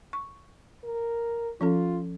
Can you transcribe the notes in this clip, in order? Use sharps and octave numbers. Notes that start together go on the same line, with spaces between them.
C#6
A#4
F3 C#4 F4 A4